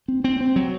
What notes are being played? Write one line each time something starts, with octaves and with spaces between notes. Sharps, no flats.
C4
C4
C4
F#3